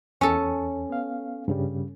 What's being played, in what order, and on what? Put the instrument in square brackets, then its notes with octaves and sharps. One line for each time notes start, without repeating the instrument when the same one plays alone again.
[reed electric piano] E2 [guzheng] C#4 A4
[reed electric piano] B3 F5
G2 C#3 G3